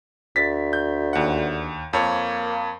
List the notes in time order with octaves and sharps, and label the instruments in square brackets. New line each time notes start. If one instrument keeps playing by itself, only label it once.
[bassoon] D2 [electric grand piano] A6 B6
[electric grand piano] G6
D#2 F#5
[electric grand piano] F2 C#5 [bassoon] A#3